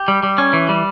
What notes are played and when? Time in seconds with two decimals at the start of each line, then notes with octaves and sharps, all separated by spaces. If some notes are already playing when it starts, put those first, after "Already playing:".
Already playing: G4
0.08 G3
0.23 G3
0.38 C#4
0.53 E3
0.69 G3